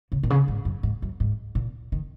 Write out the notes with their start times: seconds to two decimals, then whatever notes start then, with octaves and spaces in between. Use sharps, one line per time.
0.12 C#3
0.23 A#2
0.30 C#3
0.48 G#2
0.65 F#2
0.83 G#2
1.02 F#2
1.20 G#2
1.55 A#2
1.92 D#3